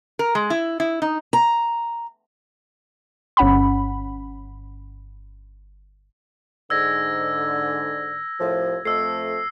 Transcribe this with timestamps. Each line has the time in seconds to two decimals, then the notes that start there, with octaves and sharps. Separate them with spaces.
0.19 A#4
0.35 G#3
0.50 E4
0.80 E4
1.02 D#4
1.33 A#5
3.37 G1 C#4 F#5 B5
6.70 G#2 D3 E6 G#6 A#6
8.40 C2 A2 F3
8.85 F2 A3 E6 C7